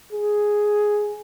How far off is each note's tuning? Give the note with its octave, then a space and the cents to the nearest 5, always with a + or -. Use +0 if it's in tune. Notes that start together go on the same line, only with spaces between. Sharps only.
G#4 +5